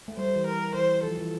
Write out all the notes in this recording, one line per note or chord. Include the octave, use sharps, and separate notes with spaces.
A3
G3 C5
G3
E3
A#4
E3 C5
F3 A4
E3